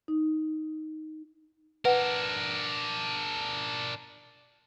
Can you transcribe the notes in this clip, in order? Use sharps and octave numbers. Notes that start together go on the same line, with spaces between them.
D#4
D4 A#4 B4 F#5